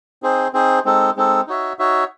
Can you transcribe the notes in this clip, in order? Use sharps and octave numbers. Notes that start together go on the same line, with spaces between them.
C4 D#4 G#4 C5
C4 D#4 G#4 C5
G#3 C4 D#4 A4
G#3 C4 D#4 A4
D#4 F#4 C#5 E5
D#4 F#4 C#5 E5